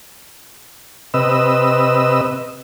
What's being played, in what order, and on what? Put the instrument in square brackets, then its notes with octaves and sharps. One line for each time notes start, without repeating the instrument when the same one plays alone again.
[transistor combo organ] C3 B4 D#5 E6